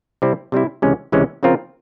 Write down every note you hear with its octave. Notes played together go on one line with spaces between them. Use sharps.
C3 G3 C4 E4
C3 G3 C4 E4
C#2 C3 E3 G#3 C#4
C#2 C3 E3 G#3 C#4
C#3 F3 C4 F4 A#4